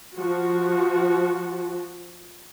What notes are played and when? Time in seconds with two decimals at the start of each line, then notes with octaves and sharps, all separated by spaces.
0.15 F3 F#4